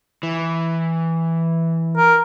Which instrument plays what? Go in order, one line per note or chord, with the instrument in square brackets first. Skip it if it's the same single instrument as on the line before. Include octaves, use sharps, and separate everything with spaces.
[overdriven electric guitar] E3
[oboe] A#4